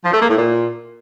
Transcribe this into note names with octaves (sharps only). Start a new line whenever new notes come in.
F3
A3
A#3
A2
A#2